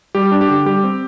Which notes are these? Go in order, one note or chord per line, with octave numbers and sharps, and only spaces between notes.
G3 G4
D4
G4
D3
G3 G4
C4